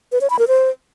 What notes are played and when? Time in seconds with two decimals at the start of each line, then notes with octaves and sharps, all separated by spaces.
0.12 B4
0.21 C#5
0.30 B5
0.39 A#4
0.48 C5